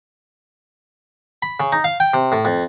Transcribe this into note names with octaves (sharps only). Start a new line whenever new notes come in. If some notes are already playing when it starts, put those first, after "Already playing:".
B5
C#3
D#4
F5
G5
C3
A2
F2